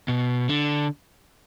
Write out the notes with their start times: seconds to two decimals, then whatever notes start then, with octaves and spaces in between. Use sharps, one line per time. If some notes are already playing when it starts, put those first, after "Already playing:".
0.08 B2
0.49 D3